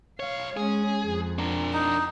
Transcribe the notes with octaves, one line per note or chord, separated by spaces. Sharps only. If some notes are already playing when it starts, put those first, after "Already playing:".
B1 C#5 F5
G#3 C#4 G#4
F2
D4 A#4
D#4